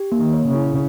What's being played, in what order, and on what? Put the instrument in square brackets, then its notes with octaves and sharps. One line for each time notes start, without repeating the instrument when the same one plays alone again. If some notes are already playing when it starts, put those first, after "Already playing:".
Already playing: [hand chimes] G4
A#3
[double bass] D#3
[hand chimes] C#5
[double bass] C#3
[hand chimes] E4